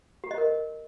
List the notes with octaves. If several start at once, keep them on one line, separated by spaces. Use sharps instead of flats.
G4
D#5
A#4